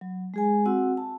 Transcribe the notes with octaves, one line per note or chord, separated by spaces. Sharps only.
F#3
G#3 G#4 G#5
C4 F#4 F#5 E6
A5